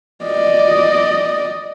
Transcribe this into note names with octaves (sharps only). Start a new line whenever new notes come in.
D5 D#5